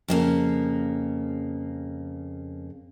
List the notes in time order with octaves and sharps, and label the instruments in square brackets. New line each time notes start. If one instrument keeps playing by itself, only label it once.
[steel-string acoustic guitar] F2 C#3 A#3